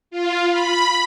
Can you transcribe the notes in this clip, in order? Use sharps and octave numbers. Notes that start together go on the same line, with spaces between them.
F4
B5